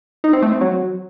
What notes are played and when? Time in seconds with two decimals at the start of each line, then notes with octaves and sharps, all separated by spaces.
0.24 D#4
0.33 C4
0.42 A3
0.52 C4
0.61 F#3